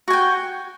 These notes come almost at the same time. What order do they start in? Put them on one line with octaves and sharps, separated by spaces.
F#4 G#5 G5